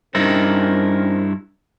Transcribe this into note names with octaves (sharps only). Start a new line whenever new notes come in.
G2 C4 C#4 D#4 E4 A#4